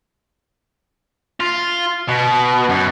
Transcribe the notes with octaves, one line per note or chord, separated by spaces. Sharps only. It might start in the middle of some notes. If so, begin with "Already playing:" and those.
F4
B2
F#2